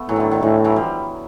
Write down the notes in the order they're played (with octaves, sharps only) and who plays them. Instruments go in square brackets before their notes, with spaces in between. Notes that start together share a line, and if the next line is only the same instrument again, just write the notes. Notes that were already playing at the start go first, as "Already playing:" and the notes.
Already playing: [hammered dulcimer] A3 B3
[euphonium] A2 [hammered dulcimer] E3 F#3
[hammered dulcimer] D3 D#3
D#3
[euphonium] A2 [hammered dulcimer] E3
[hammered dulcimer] E3 F#3
F3 G3